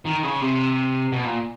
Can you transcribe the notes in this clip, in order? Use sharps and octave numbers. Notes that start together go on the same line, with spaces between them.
D#3
C#3
C3
B2
A#2